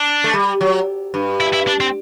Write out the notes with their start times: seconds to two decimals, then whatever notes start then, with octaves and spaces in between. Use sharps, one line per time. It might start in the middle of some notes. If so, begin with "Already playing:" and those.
Already playing: D4
0.24 A3
0.34 G3
0.61 F#3
1.14 G2
1.41 E4
1.53 E4
1.67 D4
1.80 C4